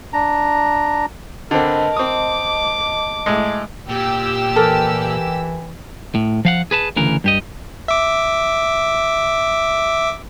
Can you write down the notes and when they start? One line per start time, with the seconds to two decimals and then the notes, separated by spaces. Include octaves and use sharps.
0.13 D4 A#5
1.51 D3 C4 A#4 B4 D#5 A5
1.97 C4 D6 D#6
3.26 A2 G#3
3.89 A#2 G4 E6
4.56 E3 A4 A#4
6.15 A2
6.45 F3 F5 F#5
6.71 G#4 B4 A5
6.96 D2 C#3 E3 A#4
7.24 G2 G4 D#5
7.88 E5 D6